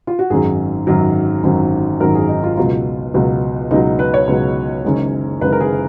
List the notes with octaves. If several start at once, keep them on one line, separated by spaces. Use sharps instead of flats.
F4
F#4
G#1 F#2 D#3 F#3 G#4
G#1 F#2 D#3 F#3
G#1 F#2 D#3 F#3
G#1 F#2 D#3 F#3 A#4
G#4
D#4
F4
C#2 B2 F#3 F4
C#2 B2 F#3
C#2 B2 F#3 D#4
B4
C#5
C#2 B2 F#3
F#1 F#2 D#3 G#3
F#1 F#2 D#3 G#3 B4
A#4
G#4